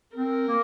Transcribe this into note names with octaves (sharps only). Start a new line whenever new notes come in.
C4 A#4
A#3